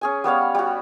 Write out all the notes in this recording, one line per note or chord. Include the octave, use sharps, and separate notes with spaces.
C#4 G#4 G#5
G3 B3 C#5 F5
G3 F#4